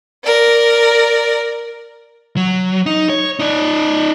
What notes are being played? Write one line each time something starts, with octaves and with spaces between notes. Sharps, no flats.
A#4 D5
F#3
D#4
C#5
D#4 D5